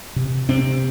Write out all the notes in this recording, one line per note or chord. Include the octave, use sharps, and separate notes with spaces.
C3
C3 C4